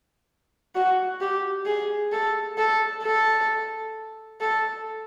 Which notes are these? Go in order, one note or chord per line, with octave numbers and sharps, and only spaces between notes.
F#4
G4
G#4
A4
A4
A4
A4